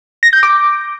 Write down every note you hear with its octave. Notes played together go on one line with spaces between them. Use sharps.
A#6
G6
D6